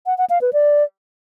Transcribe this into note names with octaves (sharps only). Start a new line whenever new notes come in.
F#5
F#5
F5
B4
D5